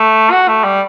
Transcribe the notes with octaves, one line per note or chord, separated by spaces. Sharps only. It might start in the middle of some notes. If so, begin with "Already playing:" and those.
Already playing: A3
F#4
A3
G3